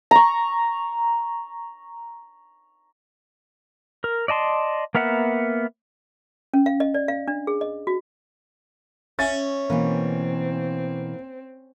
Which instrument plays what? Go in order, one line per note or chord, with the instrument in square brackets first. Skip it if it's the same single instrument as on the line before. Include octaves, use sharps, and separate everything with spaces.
[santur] A#5 C#6
[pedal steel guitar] A#4
D5 D#5 A5 C6
A#3 B3 A#4 E5 F#5
[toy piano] C#4
F5
D#5
D5
F5
D4
G#4
D#5
F#4
[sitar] C#4 [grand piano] E5 A6
[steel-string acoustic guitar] B2 E3 [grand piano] A#3 [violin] C4